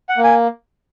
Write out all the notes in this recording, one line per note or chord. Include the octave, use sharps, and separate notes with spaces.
F#5
A#3
G#5